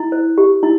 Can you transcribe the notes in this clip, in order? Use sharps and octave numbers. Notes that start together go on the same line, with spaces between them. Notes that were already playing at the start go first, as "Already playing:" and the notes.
Already playing: E4
C5
G4
E4